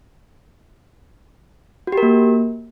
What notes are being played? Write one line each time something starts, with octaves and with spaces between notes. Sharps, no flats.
F#4
G4
A#4
A#3